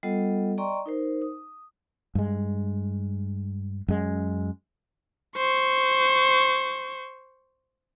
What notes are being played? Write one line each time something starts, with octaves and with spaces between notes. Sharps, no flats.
G3 B3 F4 A4 D#5 F#5
D5 D#5 G5 A#5 C6 C#6
D#4 A#4 C5
D#6
G2 G#3
F#2 G#3
C5 C#6